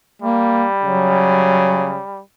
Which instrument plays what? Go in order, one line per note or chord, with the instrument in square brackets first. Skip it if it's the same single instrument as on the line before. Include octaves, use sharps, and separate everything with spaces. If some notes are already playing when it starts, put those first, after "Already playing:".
[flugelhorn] G3 [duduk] A#3
[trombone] C#3 [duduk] F#3